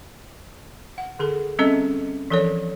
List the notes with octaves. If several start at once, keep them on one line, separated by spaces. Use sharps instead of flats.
F#5
D3 G#4 A4
G3 C4 C#4 A4 D#5
E3 F3 A4 A#4 C#5